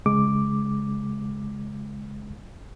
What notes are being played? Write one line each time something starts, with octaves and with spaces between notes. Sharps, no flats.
C#3 G#3 D6